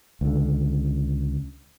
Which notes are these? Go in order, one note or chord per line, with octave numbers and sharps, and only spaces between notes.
C#2 D3